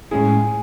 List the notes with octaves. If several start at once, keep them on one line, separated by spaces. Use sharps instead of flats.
A2 G#3 C#4 E4 G#4